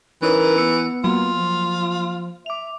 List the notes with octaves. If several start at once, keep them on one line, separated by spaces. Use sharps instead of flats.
E3 C#4 D#4 A#4 C#5
B3 E6 C#7
F#3 A#3 F4
F3
E5 D6 F7